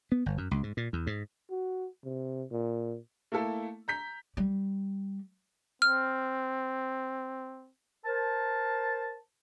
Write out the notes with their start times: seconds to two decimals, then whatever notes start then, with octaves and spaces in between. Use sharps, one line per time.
0.12 B3
0.26 G1
0.38 F#2
0.51 C#2
0.63 G#2
0.77 A#2
0.93 E2
1.07 G#2
1.51 F#4
2.05 C3
2.52 A#2
3.32 A3 A#3 E4 A4
3.88 A#5 G6 B6
4.37 G3
5.82 C4 F6
8.05 A#4 C5 A5